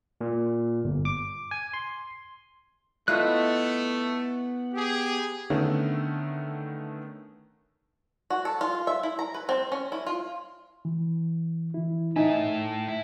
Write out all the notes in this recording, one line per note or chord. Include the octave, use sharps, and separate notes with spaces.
A#2
G1
D6
G#5
C6
A3 B3 E4 F4 D#5 F#6
G4 G#4
D3 D#3 A3 B3 C#4
F#4
A4
F4
E5
E4
A#5
B4
C4
C#4
E4
F4
E3
E3 E4
A2 D#4 E5 G#5
E4